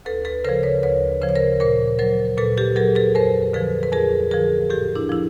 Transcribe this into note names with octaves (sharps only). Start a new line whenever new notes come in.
D2 A4 B4
A4 B4
C#3 F3 A#4 C5
B4 C#5
D2 B4 C#5
C#3 F3 C5
C#5
A#4 C5
A#2 A#4 C5
F#3 A#4 C5
A#2 A4 B4
G4 A4
F#3 G#4 A#4
A4 B4
F2 A#4 C5
D3 F3 A4 B4
B4
F2 G#4 A#4
D3 F3 G#4 A#4
A2 G4 A4
D4 E4
F3 E4